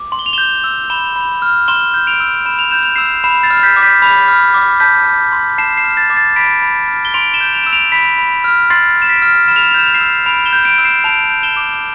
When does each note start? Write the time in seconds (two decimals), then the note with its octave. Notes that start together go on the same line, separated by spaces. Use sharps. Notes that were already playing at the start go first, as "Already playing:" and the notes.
Already playing: D6
0.12 C6
0.19 G7
0.26 F7
0.33 G6 E7 G7
0.64 E6
0.90 B5 E7 G7
1.16 B5
1.42 F6
1.68 C6 E7 G7
1.94 G6
2.07 D7 F7
2.20 E6
2.46 B5 E7
2.59 F7
2.71 G6 E7
2.83 F7
2.96 E6 C7 E7
3.24 B5 C7 E7
3.43 A6 C7
3.50 F6
3.63 G6 B6
3.76 D6
3.82 G6 B6
4.02 B5
4.28 F6
4.54 D6
4.80 A5 G6 B6
5.06 G6
5.32 C6
5.58 A5 C7 E7
5.77 C7 E7
5.84 F6
5.97 A6 C7
6.10 D6
6.17 A6 C7
6.36 B5 B6 D7
6.62 B5
6.88 F6
7.05 G7
7.14 C6 D7 F7
7.34 E7 G7
7.41 G6
7.53 D7 F7
7.64 E6 E7
7.73 D7 F7
7.92 B5 B6 D7
8.18 B5
8.44 F6
8.70 C6 A6 C7
8.97 C6
9.02 E7
9.09 B6 D7
9.22 F6
9.48 B5 E7
9.56 F7
9.63 E7
9.71 F7
9.74 G6 E7
9.87 F7
9.94 C7 E7
10.00 E6
10.26 B5 D7 F7
10.46 E7 G7
10.53 G6
10.65 D7 F7
10.78 E6
10.85 C7 E7
11.04 A5 D7 F7
11.30 G6
11.43 E7 G7
11.57 D6